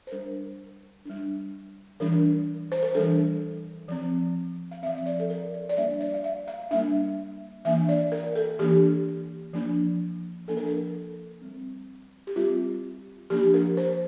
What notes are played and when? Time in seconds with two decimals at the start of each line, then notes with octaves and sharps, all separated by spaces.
0.07 C5
0.12 G3 D4 A#4
1.05 G3 D4
2.00 E3 G3 D4 A#4
2.72 C5
2.83 A#4
2.95 E3 G3 D4 A4
3.88 F3 C4
4.71 F5
4.83 C4 E5
4.86 F3
4.97 E5
5.06 D5
5.20 A4
5.30 A#4
5.54 D5
5.69 D5
5.77 G3 A#3 D4 E5
6.01 D5
6.14 F5
6.24 E5
6.48 F5
6.71 G3 A#3 D4 E5
7.65 E3 A#3 D4 E5
7.89 D5
8.12 A#4
8.35 A4
8.59 E3 A#3 D4 G4
9.53 F3 A#3 D4
10.48 F3 A#3 D4 A4
10.57 A#4
10.66 A4
11.42 G3 C4
12.27 G4
12.36 G3 C4 F4
13.30 F3 A#3 D4 G4
13.54 A#4
13.77 C5